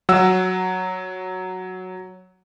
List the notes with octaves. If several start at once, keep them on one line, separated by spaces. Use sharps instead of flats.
F#3 F#5 E6